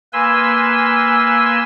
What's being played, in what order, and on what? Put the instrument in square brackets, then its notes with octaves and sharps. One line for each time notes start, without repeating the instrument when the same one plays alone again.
[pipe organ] A#3 B4 G#5 C6 E6